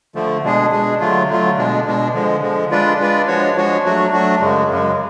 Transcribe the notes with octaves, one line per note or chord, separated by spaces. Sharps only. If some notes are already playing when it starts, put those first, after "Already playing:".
D3 F3 A3
B2 G#3 D4 G#4
B2 G#3 D4 G#4
D3 F#3 A3 F4
D3 F#3 A3 F4
B2 G#3 D4
B2 G#3 D4
D3 F3 G#3
D3 F3 G#3
G#3 D4 F4 B4 D5
G#3 D4 F4 B4 D5
F3 G#3 D4 F#4 C#5
F3 G#3 D4 F#4 C#5
F#3 A3 D4 F#4
F#3 A3 D4 F#4
F#2 C#3 G#3
F#2 C#3 G#3